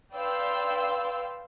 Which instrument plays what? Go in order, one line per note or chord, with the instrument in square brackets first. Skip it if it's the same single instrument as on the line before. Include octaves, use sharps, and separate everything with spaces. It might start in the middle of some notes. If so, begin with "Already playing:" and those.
[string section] B4 D5 F5 G5 C6 E6